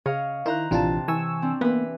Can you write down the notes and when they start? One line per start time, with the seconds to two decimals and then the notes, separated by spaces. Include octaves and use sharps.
0.06 C#3 C#5 D#5 F5
0.46 D#3 E4 C5 A#5 F#6
0.71 A#1 C3 E3 D4 F4 A5
1.08 E3 G#5 C#6 E6
1.42 C4 D4
1.61 E3 A#3 B3 B4